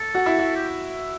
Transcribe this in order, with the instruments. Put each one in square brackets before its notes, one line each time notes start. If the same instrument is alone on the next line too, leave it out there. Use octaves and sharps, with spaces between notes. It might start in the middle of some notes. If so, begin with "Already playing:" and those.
Already playing: [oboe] A4
[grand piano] F#4
E4
F#4
[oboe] G4